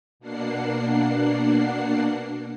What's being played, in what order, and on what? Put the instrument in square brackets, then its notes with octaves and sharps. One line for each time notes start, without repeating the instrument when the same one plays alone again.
[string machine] B2 A#3 D4 F#5 C7